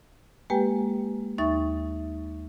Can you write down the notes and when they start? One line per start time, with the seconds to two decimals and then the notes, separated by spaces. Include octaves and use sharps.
0.50 G#3 A#3 G4 B4 G5 G#5
1.38 D#2 D#4 E5 C#6 A6